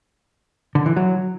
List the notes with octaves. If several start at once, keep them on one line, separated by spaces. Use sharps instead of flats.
D3
E3
F#3